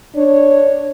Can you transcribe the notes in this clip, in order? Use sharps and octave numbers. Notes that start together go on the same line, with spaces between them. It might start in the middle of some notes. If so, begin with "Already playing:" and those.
D4 C#5